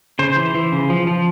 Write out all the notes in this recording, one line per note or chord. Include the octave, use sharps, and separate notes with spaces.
C#3 C5
E3
E3
C#3
F3
F3